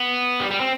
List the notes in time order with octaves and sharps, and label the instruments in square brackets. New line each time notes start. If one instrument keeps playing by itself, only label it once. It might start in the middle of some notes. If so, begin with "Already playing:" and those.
Already playing: [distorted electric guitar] B3
G3
G3
C4